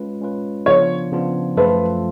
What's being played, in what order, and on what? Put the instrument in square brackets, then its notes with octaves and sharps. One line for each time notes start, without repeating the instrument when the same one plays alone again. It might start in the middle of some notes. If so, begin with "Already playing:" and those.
Already playing: [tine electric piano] G#3 C#4 F4 B4
G#3 C#4 F4 B4
[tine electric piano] C#3 F3 B3 D4 F4 [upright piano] C#5
[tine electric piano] C#3 F3 B3 D4 F4
[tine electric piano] F#2 F3 A3 F4 A4 [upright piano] B4